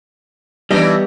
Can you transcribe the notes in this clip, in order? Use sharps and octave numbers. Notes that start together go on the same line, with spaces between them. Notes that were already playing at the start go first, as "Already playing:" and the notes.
E3 G3 B3 D4 D#4 D#5